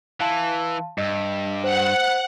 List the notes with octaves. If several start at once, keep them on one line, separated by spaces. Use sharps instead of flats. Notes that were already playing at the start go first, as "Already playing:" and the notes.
E3 F5 A5 C6
G2 D#5 E6
C5 F#5